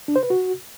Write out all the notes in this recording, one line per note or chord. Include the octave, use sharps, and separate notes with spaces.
D4
C5
B4
F#4